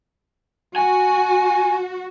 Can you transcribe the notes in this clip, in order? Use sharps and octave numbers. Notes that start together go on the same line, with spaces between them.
F#4 G#5